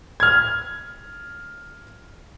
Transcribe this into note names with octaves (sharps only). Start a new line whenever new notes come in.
F6 G#6